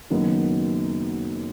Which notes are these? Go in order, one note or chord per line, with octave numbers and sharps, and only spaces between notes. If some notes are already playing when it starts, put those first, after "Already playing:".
F#1 F#2 D#3 B3